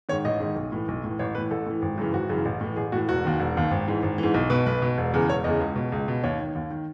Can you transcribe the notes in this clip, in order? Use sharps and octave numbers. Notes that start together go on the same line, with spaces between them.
G#2 D#3 C#5
A1 D#5
G#2 D#3
B1
A2 E3
B1
A2 E3
A1 C#5
A2 E3 B4
A1 A4
A2 E3
G#1
F#2 C#3 E3
G#1 F#4
F#2 C#3 E3
A1
A2 E3
A1 G#4
A2 E3 F#4
E1 F#4
D#2 D#3
E1
D#2 D#3
G#1
G#2 E3
G#1
G#2 E3
B1
B2 B4
B1 B4
B2
E1
E2 C#3
E1 C#5
E2 C#3 D#5
C#2
B2
C#2
B2
D#2 C#5
D#3
D#2
D#3